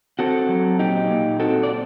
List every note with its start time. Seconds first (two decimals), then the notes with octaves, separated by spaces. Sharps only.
0.19 C4 F#4 A4
0.49 F#3
0.79 A#2 D#4 G4
1.11 A#2
1.40 C4 F#4 A4
1.63 D5